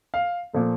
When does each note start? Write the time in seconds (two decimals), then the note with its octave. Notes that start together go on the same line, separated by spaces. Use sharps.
0.14 F5
0.53 A#2 F3 A3